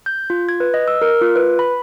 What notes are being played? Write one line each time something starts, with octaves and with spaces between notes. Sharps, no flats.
G6
F4
G#6
B4
D#5
E6
A#4
F4
B4
B5